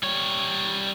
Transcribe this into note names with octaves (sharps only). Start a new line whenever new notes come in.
G3 C#5